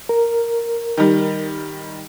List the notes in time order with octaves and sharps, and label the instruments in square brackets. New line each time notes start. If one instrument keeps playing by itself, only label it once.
[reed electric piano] A#4
[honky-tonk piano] D#3 G3